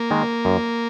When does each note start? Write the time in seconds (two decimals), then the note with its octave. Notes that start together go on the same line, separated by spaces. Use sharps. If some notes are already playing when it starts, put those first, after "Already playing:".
Already playing: A#3
0.11 D#3 G#3
0.45 F#2